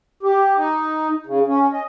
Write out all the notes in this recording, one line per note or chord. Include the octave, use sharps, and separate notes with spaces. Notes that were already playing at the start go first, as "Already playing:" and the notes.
G4
D#4
C#3
C#4
D#5